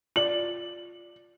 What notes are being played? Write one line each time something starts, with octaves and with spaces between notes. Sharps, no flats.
F4 D5 F#7